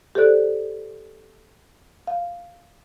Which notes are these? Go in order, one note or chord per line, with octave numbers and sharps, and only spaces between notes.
G4 A4 C5 D5 F#6
F5